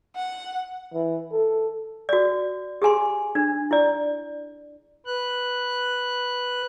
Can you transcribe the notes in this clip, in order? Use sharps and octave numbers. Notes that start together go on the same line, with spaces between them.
F#5
E3
A4
F#4 D5
G4 G#4 G#5 C6
D4
E4 D5
B4 F#6